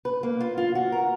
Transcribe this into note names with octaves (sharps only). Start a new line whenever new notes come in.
B4
A#3
F4
F4
F#4
A#4